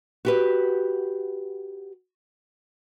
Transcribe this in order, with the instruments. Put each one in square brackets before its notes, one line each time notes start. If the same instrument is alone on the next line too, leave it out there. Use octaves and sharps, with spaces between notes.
[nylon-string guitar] F#4 G4 B4